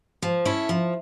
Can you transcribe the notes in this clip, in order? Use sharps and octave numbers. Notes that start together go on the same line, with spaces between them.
F3
C#4 E4 A4
F3